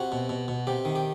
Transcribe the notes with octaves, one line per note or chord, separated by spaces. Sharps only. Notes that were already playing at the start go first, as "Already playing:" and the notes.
Already playing: C3 F#4
B2
B2
B2
C3 G4
D#3
G4